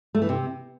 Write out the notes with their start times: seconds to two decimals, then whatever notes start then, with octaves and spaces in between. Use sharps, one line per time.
0.15 A3
0.22 E3
0.29 C3